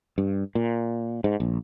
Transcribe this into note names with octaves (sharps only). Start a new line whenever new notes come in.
G2
A#2
G#2
A#1